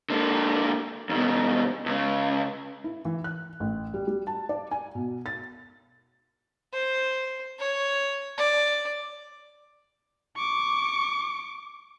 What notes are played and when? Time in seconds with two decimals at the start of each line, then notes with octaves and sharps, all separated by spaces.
0.10 D3 A#3
1.09 D#2 B2
1.86 C#2 C#3
2.84 E4
3.05 E3
3.24 F#6
3.60 A1
3.94 G3
4.07 G3
4.27 A5
4.49 D5
4.71 G#5
4.95 B2
5.26 A6
6.73 C5
7.59 C#5
8.38 D5
10.36 C#6 D6